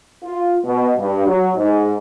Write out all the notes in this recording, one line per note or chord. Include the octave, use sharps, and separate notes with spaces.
F4
B2
G2
F#3
G#2